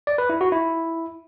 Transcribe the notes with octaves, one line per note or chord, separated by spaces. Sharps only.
D5
B4
E4
F#4
E4